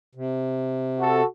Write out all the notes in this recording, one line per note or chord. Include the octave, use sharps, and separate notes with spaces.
C3
F#4 A4